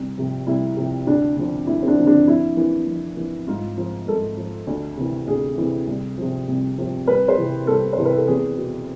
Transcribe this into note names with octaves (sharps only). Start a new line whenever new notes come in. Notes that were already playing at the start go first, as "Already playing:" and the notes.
Already playing: C2
C3 F3
C2 E4
C3 F3
D2 D4
D3 F3
D2 E4
C4
D4
D3 F3
D4
F2 E4
E3
F2
E3
G#2 F4
F3
G#2 A4
F3
D2
C3 E3
D2 G#4
C3 E3
C2
C3 F3
C2
C3 F3
C2 B4
C5
C3 E3
C2 A4
C5
C3 E3
B4
A4
E2 G#4
B2